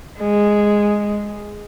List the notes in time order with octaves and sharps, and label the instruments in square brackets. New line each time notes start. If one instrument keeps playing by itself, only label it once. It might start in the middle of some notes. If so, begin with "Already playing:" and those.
[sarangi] G#3